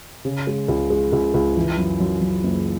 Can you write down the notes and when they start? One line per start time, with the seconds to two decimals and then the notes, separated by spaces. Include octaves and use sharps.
0.25 C#3
0.47 G#3
0.68 C#2
0.90 G#3
1.12 C#2
1.34 C#2
1.56 E3
1.78 F#2
2.00 F#2
2.21 F#2
2.43 F#1